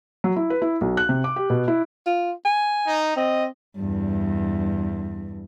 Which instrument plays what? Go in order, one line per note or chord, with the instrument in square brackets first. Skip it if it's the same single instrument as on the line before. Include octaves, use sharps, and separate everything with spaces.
[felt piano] F#3
E4
B4
E4
B1
F#6
C3
D6
G4
B2
E4
[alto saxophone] F4
G#5
[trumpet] D#4
[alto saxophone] C4 [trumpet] D#5
[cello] E2 G2